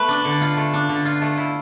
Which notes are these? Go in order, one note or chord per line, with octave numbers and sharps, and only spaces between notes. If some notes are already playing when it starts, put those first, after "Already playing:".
Already playing: A3 B3 B4
D4
D3
F4
A3
D4
D3
F4
A3
E4